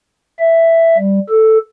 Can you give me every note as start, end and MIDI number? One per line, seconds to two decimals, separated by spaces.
0.39 0.97 76
0.97 1.19 55
1.29 1.58 69